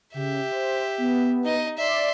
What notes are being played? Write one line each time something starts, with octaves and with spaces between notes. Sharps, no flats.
C#3 G4 E5
C5
B3
D#4 D#5
D5 E5 C6